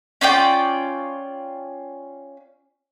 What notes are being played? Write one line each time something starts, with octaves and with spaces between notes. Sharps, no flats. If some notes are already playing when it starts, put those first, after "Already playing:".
C#4 F4 D5 G5